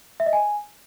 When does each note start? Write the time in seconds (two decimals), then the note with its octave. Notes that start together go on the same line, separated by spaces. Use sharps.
0.20 E5
0.26 D#5
0.33 G#5